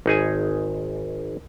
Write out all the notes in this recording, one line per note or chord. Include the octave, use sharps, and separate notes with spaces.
G#1 D#4 G#4 G#5